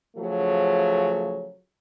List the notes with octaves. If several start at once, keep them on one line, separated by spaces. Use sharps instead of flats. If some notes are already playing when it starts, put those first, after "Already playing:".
C#3 F3 F#3 A3